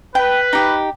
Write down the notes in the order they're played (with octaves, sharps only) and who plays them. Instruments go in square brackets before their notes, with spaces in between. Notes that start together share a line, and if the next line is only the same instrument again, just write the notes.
[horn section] B4 [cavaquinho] G5
[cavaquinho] D#4 G4